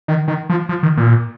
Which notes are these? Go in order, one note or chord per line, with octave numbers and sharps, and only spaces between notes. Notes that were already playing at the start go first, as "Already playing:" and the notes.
D#3
D#3
F3
F3
D#3
A#2